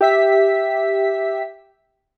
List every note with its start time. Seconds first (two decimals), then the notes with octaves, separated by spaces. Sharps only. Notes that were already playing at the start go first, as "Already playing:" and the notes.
0.01 G4 E5 B6